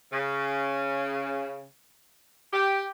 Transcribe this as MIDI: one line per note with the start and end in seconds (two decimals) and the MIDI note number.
0.11 1.65 49
2.53 2.86 67